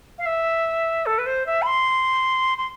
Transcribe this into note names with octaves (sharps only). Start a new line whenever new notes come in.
F5
E5
A4
B4
C5
E5
B5
C6
C6